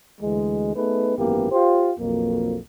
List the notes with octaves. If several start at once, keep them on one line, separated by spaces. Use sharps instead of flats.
D2 E3 G#3
A3 B3 D#4 G#4 B4
G#1 F#2 E3 A#3 B3 G4
F4 G4 C5
B1 F2 A#3